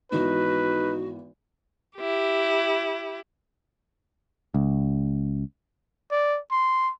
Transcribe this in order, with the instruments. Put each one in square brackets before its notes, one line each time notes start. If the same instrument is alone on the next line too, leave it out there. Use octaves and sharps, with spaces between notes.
[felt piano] G#1 E3 B3 [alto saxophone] D#4 [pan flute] F#4 [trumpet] B4
[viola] E4 G4
[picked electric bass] C#2
[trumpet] D5
C6